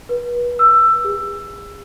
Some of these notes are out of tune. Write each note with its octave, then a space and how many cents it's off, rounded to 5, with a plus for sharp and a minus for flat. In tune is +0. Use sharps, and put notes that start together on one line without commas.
B4 -35
E6 +15
G#4 -40